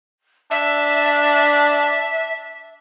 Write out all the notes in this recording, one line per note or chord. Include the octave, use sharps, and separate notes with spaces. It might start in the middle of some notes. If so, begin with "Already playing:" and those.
D4 E5